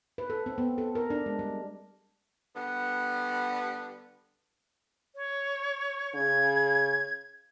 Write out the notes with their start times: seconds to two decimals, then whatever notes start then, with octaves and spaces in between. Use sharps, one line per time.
0.18 B4
0.30 A4
0.46 C4
0.58 B3
0.78 A4
0.95 A#4
1.10 D4
1.26 G#3
1.39 G3
2.55 D3 G3 B3
5.16 C#5
6.14 C#3 G#6